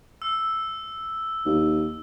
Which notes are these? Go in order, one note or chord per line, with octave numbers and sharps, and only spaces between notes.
E6
D#2